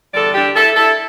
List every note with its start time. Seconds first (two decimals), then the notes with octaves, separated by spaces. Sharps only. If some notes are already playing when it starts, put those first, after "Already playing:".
0.14 E2 D3 G3 A4 D5
0.34 D4 G4
0.55 E4 A4
0.76 E4 A4